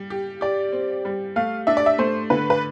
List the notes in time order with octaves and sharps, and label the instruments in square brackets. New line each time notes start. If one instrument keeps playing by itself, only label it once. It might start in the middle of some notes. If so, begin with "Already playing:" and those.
Already playing: [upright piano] G3
G4
[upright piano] G4 [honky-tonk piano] D5
[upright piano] C4
G3
[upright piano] A3 [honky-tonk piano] F5
[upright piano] D4 [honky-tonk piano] E5
[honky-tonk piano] D5
E5
[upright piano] A3 [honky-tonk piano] C5
[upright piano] D3 [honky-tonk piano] B4
[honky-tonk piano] B4